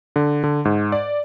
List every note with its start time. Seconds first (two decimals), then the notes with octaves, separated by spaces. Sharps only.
0.16 D3
0.44 D3
0.65 G#2
0.92 D5